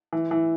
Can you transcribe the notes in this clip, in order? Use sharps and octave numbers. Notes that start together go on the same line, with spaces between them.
E3
E3